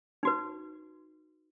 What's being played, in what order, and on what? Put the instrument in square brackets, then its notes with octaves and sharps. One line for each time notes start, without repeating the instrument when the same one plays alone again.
[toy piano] D#4 F#4 B4